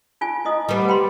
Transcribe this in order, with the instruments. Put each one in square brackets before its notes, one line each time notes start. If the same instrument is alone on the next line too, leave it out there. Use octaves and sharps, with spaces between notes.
[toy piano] D#4 F4 G#5
E4 D#5 D#6
[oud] G3 B3
[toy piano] G5 B5 C6